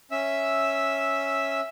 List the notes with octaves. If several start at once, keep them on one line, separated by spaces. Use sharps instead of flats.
C#4 E5 E6